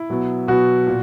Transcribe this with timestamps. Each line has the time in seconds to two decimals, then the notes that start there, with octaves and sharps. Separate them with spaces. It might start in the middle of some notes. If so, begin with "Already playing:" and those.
Already playing: E4
0.09 B2 F#3 B3
0.48 B2 F#3 B3 F#4
0.87 A#2